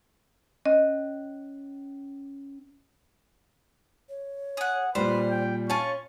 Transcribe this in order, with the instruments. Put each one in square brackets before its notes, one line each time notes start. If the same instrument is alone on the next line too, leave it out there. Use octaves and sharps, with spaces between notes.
[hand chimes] C#4 [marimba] D#5
[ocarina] C#5
[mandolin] G#4 F#5
[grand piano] A#2 G3 [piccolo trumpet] B4 [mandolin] C5 [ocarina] D5
[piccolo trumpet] G5
[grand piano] C#4 [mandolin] F4 G#5 A5 [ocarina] C#5 [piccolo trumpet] C#6